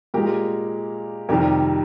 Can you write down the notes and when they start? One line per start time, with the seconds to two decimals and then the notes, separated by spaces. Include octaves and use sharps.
0.14 A#2 G#3 G4 A#4
1.29 F2 C3 D#3 G3 G4 A#4